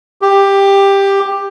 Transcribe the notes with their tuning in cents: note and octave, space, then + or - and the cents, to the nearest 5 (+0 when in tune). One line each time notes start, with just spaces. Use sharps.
G4 +10